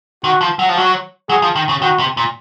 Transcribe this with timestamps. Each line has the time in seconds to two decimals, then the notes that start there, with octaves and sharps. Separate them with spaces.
0.24 D#3 F#4
0.41 F3
0.59 F#3
0.69 F3
0.76 F#3 F#4
1.29 F#3 G#4
1.42 F3
1.56 D#3
1.69 C#3
1.82 D#3 F#4
1.99 C3
2.17 A#2